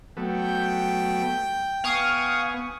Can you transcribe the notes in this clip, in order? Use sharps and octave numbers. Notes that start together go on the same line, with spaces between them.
F#3 A3 B3 G5
B3 F5 G#5 C#6 D#6